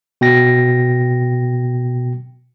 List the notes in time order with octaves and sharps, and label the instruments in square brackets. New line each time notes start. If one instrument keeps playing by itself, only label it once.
[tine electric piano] B2 G5 A#6